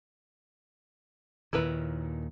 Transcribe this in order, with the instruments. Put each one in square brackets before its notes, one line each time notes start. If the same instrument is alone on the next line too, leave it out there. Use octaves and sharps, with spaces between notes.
[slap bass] D#2 A#2 D#3 [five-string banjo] E4 A#4 B4